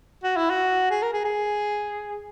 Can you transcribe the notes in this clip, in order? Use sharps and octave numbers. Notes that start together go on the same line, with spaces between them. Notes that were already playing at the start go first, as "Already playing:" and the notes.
F#4
E4
F#4
G#4
A#4
G#4
G#4